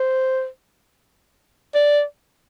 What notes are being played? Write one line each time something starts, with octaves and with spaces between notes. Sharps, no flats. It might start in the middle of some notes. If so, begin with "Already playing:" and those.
Already playing: C5
D5